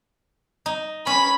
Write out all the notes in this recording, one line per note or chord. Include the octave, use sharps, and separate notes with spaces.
D#4
C#4 B5